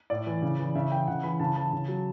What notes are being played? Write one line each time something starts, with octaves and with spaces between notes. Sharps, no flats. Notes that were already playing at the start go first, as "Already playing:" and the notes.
A2 D5
E3
C#3
E3
C#3 E5
E3 G5
C#3 F#5
E3 B5
C#3 A5
E3 A5
C#3
F#3